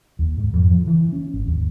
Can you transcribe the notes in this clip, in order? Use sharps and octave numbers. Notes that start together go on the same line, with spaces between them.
D#2
G#2
F2
F3
E3
C#4
G#1
D#2